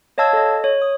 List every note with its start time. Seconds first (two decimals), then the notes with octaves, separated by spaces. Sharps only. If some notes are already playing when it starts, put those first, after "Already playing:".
0.18 C#5 D#5 F5 A5 E6 G#6
0.33 A4 D#5
0.64 C#5
0.82 D#6